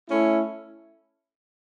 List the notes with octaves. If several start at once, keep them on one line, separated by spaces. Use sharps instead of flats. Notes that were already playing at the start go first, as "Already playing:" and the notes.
A3 C#4 E4